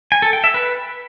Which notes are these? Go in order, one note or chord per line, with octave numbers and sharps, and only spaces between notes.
G#5
A4
G5
E5
B4